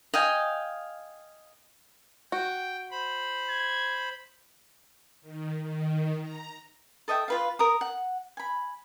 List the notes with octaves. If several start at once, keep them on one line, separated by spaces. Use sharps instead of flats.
D#5 F5 G5 G#5
F#4 G5
C5 B5
G#6
D#3
D#3
A#5
A4 D#5 E5 G5
F4 B4 F5
A#4 A#5 D#6
F#5
G#5 B5